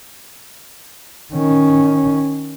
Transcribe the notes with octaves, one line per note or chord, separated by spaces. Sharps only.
D#3 C#4